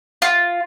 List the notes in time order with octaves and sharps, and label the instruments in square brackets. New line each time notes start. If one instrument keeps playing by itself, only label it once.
[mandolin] F4